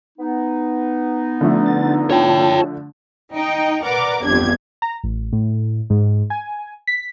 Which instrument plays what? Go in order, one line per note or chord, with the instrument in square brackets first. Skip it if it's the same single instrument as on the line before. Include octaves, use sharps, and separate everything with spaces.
[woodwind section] B3 D#4
[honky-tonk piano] D3 F3 A3
[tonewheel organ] A6
[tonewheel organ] F4 A5 [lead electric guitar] C#5 G5
[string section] D#4 G5
A#4 B4 D5 F#5 D6
G1 F2 D4 G4 G#6
[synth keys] A#5
A1
A2
G#2
G#5
B6